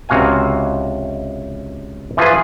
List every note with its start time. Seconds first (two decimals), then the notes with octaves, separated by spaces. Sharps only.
0.09 C#2 C3 F#4 F5 G#5
2.17 E3 F3 F4 G#4 B4